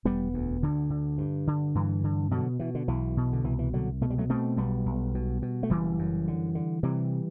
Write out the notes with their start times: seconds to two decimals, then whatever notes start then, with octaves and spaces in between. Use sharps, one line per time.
0.05 E1 G3 B3
0.34 D2
0.62 D2 D3
0.90 D3
1.18 G2
1.47 D3
1.75 G2 E3
2.04 D3
2.31 B2 D3 F#3
2.59 B2 E3
2.75 D3
2.88 B1 E3
3.17 B2
3.33 D3
3.44 C2 E3
3.59 E3
3.73 C2 D3 F#3
4.01 B2 A3
4.10 G3
4.18 F#3 A3
4.29 B2 A3 C4
4.57 B1 G3 B3
4.86 B1
5.15 B2
5.42 B2
5.63 A3
5.70 F#1 E3 G3
5.99 F#2
6.28 D3
6.55 D3
6.83 C3 E3 G3